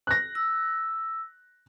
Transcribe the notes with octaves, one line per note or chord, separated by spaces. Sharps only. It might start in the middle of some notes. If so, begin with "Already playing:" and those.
F#6 A#6
E6